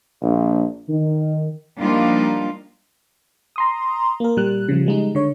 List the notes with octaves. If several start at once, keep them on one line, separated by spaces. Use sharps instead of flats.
A#1
D#3
F3 G3 A#3 D4 D#4 F4
A#5 C6 D#6
A#3 A#4
A#2 G3 F#6
C#3 F3 G3
G3 G#3 D#4
D3 C#5